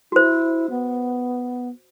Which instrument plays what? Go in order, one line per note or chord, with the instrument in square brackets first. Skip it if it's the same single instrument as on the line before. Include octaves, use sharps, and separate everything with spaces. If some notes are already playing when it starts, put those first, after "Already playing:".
[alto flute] E4 [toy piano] F#4 C5
[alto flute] B3